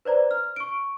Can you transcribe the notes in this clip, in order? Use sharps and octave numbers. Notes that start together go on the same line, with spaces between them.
B4 C5 D5 A#5
F6
C#6 D7